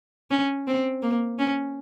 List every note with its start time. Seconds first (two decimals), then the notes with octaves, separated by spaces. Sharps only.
0.31 C#4
0.67 C4
1.02 A#3
1.39 C#4